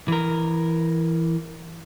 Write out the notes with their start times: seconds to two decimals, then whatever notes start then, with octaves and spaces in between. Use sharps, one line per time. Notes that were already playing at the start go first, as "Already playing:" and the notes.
0.08 E3 A#4